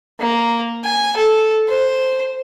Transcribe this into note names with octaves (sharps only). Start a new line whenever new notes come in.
A#3
G#5
A4
C5